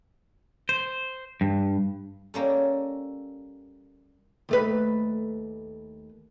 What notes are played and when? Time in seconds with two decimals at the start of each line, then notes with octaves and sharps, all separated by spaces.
0.69 C5
1.41 G2
2.34 G3 A#3 C#4 A4
4.49 D#2 A3 B4